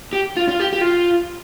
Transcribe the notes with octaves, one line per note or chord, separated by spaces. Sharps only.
G4
F4
F4
G4
G4
F4